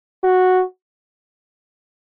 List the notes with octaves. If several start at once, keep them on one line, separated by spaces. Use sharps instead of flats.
F#4